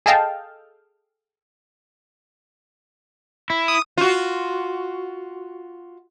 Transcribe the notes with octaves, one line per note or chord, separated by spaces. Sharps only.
G#4 A4 D#5 F5 G5 A5
E4
D#6
F4 F#4